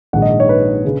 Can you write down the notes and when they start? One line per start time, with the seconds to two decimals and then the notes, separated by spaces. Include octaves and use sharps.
0.13 A#1 G#2 D#3 F#5
0.22 D#5
0.40 C#5
0.49 B4
0.85 C#3